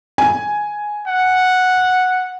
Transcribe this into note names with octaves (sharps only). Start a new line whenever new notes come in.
G#5
F#5